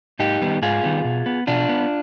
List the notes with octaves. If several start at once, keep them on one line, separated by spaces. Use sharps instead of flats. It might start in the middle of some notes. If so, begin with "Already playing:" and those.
G#2 D#4 G4
D#3 G3 B3
G#2 F4 G#4
D#3 G3 B3
B2
B3
B2 D4 F4
B3